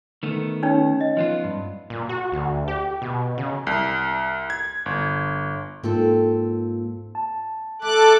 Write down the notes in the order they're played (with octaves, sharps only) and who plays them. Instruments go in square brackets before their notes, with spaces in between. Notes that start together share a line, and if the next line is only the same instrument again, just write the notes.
[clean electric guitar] D#3 A3 B3
[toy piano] C#4 D#4 C#5
D#5
[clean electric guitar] F3 B3 F4
G2
[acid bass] A#2
F#4
D2
G4
B2
C#3
[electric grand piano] C2
G#6
G1
[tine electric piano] G#2 A#3 F4 [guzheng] C4 A4
[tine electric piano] A5
[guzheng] A3 [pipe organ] A4 D6 F#6